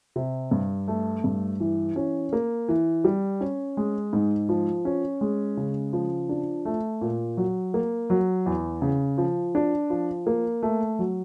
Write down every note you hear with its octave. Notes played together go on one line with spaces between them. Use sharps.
C3
G2
A3
G2
E3
C#4
A#3
E3
G3
C#4
G#3
G#2
F3
C#4
G#3
C#3
F3
D4
A3
A#2
F#3
A#3
F#3
E2
C#3
F3
D4
F3
A#3
A3
F#3